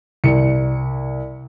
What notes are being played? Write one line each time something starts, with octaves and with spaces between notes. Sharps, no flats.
C2 C#7